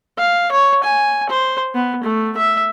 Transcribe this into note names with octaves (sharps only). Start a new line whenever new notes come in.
F5
C#5
G#5
C5
B3
A3
E5